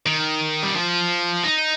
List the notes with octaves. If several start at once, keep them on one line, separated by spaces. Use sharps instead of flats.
D#3
G3
F3
D#4